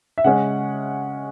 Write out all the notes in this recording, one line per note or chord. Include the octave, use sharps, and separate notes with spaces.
E5
C#3 G#3 C#4 F#5